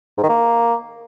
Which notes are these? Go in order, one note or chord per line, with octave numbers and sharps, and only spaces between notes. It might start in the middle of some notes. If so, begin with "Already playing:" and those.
G#2
D#3
A#3